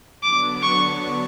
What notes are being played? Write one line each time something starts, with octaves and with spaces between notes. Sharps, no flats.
D3 F#3 B3 D4 D6
C#6